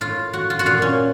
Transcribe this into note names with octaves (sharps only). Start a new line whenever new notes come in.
A2 F4
F#4
F4
F#4
A#2 F4
C#4